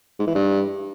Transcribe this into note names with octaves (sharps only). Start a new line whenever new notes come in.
G#2
E3
G2